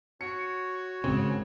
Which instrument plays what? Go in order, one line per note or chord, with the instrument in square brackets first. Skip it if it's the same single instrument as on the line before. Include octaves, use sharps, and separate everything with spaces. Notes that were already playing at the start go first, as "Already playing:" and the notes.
[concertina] F#4 C#5 [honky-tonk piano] C#7
[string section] G#1 [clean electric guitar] C#3 [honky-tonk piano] C4